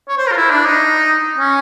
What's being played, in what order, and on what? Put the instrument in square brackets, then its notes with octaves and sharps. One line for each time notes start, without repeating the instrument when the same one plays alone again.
[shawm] C#5
C5
A#4
F4
E4
D4
D#4
C#4